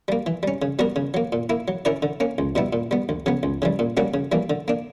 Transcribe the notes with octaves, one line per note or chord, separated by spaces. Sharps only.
G3 A#3
E3
G3 C#4
C#3
G3 B3 F#4 A#4
C#3
F#3 A#3
A#2
A#3 E4
F#3
C#4 E4 A#4 D5
D3
A#3 C#4
C#2
B2 G3 B3 E4
A#2
G3 B3
D2
C#3 F#3 B3
C#2
C#3 E3 G3
A#2
G3 A#3 C#4 F#4
C#3
E3 G3 A#3
D3
A#3 D4